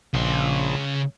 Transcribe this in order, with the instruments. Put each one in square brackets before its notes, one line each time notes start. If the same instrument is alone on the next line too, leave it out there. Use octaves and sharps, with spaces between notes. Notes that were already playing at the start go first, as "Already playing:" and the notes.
[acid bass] A#1 [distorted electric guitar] C#3 C6